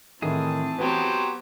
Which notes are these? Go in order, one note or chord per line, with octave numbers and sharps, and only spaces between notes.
A2 D#3 E3 C4 G#4 A5
F#3 B3 G4 C5